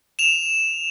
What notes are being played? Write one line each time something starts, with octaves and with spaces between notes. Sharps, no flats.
E7 F7